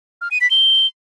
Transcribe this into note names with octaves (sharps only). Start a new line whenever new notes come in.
F6
D#7
B6
G7